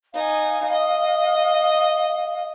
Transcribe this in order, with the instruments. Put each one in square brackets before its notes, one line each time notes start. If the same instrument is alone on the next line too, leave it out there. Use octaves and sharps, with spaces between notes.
[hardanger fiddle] D#4 G#5 [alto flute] F5
[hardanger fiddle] D#5